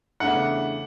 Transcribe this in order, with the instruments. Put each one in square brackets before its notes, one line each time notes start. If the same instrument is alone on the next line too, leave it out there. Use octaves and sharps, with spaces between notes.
[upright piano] E2 C#3 E3 A3 D4 [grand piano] F#5